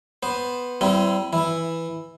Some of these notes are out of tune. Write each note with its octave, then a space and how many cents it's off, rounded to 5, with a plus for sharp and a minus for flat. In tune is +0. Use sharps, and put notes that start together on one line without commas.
B3 +0 C5 +0
G3 -30 C4 -25 E4 +15
E3 +0 E4 +0